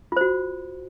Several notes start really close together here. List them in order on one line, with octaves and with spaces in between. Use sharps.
F4 C5 F#4